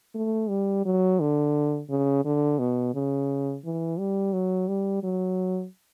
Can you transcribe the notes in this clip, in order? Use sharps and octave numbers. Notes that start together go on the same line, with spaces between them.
A3
G3
F#3
D3
C#3
D3
B2
C#3
E3
G3
F#3
G3
F#3